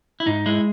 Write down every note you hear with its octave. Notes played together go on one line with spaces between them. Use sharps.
E4
G#2 D#4
G#3 E4